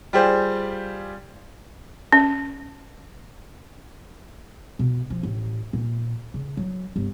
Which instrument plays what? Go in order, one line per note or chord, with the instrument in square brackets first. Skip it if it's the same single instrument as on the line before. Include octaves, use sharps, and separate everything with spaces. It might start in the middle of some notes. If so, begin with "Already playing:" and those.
[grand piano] G3 F4 G4 G#4 C5
[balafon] C#4
[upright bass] B2
F3
A1
A#2
C#3
F#3
G1